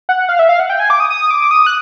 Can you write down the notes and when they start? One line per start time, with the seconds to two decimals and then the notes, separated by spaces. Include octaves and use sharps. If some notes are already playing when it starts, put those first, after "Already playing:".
0.09 F#5
0.29 F5
0.39 E5
0.49 F5
0.60 F#5
0.70 G5
0.80 G#5
0.90 D6
1.00 D#6
1.10 D#6
1.31 D6
1.51 D#6
1.66 F#6